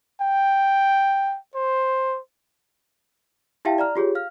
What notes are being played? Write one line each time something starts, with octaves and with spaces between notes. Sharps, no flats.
G5
C5
E4 G4 E5 F5 G5 A5
D5 A#5 F6
F4 G4 G#4 C#5
F5 F6